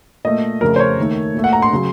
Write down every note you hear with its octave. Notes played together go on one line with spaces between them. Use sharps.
A#2 A3 D#5
F2 C#3 A3 A#4
C5
C#5
D#2 D#3 A3
A#2 A3
F#5
A#5
C6
C#3 F#3